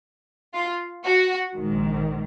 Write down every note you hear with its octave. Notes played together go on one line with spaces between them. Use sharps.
F4
F#4
A#1 G#2 D#3